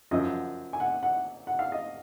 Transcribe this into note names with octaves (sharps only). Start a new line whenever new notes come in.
F#2 F3 D#5
G#5
F#5
F#5
F#5
F5
D#5